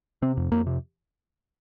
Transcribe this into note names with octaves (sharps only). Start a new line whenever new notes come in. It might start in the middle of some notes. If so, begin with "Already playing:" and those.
C3 C4
F2
F2 A#3
C3